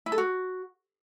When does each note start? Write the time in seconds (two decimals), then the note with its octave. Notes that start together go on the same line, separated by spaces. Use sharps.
0.06 E4
0.12 A4
0.18 F#4